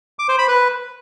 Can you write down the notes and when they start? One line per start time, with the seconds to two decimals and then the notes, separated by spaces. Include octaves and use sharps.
0.19 D6
0.29 C5
0.38 B5
0.48 B4